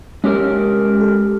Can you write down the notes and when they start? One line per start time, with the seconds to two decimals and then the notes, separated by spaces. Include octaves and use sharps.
0.24 G#3 C#4 G4 A#4
1.01 A4